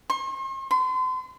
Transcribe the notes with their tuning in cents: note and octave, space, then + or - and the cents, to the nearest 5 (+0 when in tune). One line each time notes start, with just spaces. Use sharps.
C6 +45
C6 -40